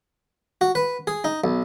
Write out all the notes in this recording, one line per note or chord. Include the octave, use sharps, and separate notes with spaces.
F#4
B4
G#4
D#4
B1